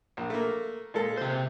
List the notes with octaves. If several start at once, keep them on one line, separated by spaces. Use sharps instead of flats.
A#1
A3 A#3
A#2 G#3 A4
C3 C5